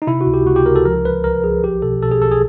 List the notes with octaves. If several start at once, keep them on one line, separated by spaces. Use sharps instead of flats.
D#4
C3 E4
F#4
C#2
G4
C#2 F#4
G4
C#2 A#4
A4
F3 A#4
C2 B4
C2 A#4
F3 G#4
B1 G4
B2 A4
B2 A4
G#4
B1 A4
G#4